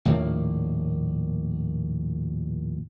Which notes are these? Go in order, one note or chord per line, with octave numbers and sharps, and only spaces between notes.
A#1 D#2 A2 A#3